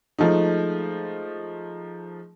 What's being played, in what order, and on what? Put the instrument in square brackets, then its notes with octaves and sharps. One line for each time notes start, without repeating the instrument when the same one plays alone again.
[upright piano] F3 G#3 A3 D#4